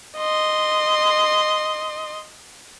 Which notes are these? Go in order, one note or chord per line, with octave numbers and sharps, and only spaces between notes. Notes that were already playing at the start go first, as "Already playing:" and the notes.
D#5 C6